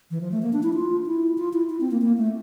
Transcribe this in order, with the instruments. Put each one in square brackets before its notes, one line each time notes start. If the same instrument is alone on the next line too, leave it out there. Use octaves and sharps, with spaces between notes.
[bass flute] E3
F3
A3
A#3
D4
E4
F4
E4
F4
E4
E4
C4
A#3
A#3
A3